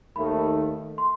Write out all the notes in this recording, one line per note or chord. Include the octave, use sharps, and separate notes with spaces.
D#2 D#3 A3 B5
C6